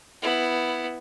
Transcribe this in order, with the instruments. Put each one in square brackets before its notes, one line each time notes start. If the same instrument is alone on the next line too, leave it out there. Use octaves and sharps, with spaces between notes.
[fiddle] B3 E4